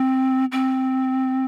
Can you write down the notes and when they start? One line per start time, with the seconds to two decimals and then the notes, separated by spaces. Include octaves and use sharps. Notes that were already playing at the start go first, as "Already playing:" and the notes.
Already playing: C4
0.52 C4